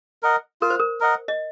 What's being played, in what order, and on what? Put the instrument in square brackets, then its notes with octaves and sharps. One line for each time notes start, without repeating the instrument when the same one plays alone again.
[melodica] A#4 D#5 F#5
[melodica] F4 [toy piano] A#4
[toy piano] C5
A#4
[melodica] A#4 D#5 F#5
[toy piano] D#5